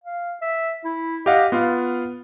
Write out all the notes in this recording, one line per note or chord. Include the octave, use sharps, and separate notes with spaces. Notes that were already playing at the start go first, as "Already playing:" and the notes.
F5
E5
E4
G4 D#5 F5 F#5
B3 F4 F5 F#5